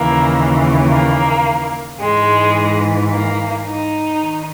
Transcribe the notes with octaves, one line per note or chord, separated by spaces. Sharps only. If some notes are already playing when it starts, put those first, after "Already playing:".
Already playing: D#2 C#3 E3 A#3
A#3
G#2 E3 G#3
A#3
D#4
D#3